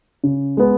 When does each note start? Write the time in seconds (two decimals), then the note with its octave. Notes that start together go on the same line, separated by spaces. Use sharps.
0.24 C#3
0.57 G#3 B3